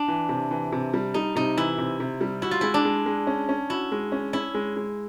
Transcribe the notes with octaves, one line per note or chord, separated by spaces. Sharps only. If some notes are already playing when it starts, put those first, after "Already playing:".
Already playing: D4
E3
C3
E3
C3
G3
G3 D#4
C3 D#4
E3 E4
C3
C3
G3
E4 F#4
F4
G#3 E4
D4
G#3
G#3
C#4
C#4
E4 F#4
G#3
C#4
C#4 E4
G#3
G#3